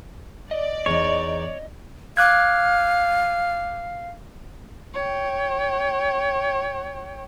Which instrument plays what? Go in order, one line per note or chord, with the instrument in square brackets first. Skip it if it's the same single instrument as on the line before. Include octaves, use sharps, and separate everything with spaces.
[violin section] D5 [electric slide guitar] D#5
[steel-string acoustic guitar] E2 D#4 [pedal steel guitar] C#5
[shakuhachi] F5 [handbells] D6 F#6 G#6
[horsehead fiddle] C#5 G5